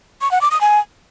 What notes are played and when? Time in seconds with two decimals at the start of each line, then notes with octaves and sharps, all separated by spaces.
0.21 C#6
0.31 F#5
0.41 D6
0.51 D#6
0.61 G#5